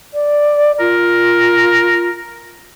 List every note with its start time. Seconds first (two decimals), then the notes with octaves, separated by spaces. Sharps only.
0.14 D5
0.80 F4 A#4